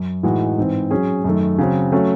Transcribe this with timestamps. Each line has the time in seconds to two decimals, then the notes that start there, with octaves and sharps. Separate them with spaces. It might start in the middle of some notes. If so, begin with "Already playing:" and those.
Already playing: F#2
0.23 A2 E3 G#3 D#4 F#4
0.58 G#2 E3 C4
0.91 F#3 C#4 G#4
1.25 F#2 D#3 A3
1.58 C#3 F#3 C4
1.92 F#3 A3 C#4